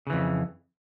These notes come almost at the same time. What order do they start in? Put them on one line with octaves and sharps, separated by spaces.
C#3 E3 F2